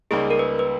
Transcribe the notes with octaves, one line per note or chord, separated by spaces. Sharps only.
C#2 C#3 G3 A#3 D#4 G#4
A#4
B4
B4